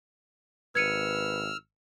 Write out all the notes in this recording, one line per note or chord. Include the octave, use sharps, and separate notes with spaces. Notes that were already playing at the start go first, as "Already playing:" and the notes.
G#1 B4 E6 F6 G#6 C#7 D#7